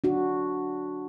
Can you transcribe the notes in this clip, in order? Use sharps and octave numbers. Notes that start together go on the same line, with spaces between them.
D4 F#4